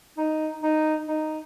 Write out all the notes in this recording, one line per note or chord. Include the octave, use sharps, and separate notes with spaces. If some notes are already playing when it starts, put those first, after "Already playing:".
D#4
D#4
D#4